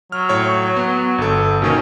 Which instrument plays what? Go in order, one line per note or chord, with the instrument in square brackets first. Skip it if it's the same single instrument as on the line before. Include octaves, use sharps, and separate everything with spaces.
[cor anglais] F#3 [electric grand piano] F6
[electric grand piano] A2 C#5 C#6
B3
G1 A4
[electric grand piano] B2 D#3 A#3 [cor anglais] C#4